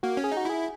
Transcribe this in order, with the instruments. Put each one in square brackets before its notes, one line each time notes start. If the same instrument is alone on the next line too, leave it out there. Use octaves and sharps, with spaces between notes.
[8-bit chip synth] A#3 [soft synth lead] F#4
[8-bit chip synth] C#4
[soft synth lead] G#4
[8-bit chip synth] D#4
[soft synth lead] F#4
[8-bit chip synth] E4 [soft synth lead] G#4